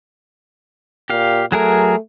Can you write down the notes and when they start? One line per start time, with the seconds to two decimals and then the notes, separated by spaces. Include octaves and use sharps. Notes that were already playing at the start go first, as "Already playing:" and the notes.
1.10 A#2 G4 F5
1.52 F#3 A3 G#4 A#4